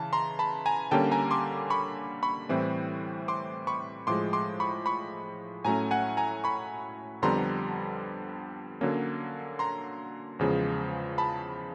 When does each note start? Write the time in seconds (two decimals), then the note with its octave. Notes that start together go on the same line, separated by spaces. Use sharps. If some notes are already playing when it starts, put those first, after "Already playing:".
Already playing: C#3 E3 A5
0.13 A#5 C6
0.39 A5 B5
0.66 G#5 A#5
0.91 D3 G3 A#3 C#4 G5 A5
1.12 G#5 A#5
1.31 C6 D6
1.70 B5 C#6
2.23 B5 C#6
2.49 A2 E3 G3 C4
3.28 C6 D6
3.67 B5 C#6
4.07 A2 F3 G#3 C6 D6
4.33 C6 D6
4.60 B5 C#6
4.86 B5 C#6
5.65 A2 F#3 A3 C#4 G#5 A#5
5.91 F#5 G#5
6.17 G#5 A#5
6.44 B5 C#6
7.22 F2 D3 G3 B3 A#5 C6
8.81 D3 F#3 A#3 C#4
9.59 A#5 C6
10.39 E2 C#3 F3 G#3
11.18 A5 B5